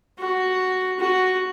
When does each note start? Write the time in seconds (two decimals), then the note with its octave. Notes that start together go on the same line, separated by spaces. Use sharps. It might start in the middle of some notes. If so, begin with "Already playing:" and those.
0.19 F#4
1.00 F#4